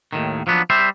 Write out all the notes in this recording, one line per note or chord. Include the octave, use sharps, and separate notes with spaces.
D#2 A2 D#3
F3 F#3 B3 D4
G3 C5 E5